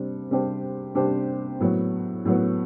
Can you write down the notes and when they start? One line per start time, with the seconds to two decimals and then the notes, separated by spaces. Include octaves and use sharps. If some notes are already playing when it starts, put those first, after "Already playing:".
Already playing: C3 G3 D4 C5
0.31 C3 G3 D4 G4 C5
0.95 C3 G3 D4 G4 C5
1.60 A2 F#3 B3
2.25 A2 F#3 B3